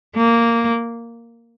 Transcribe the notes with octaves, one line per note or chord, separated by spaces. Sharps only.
A#3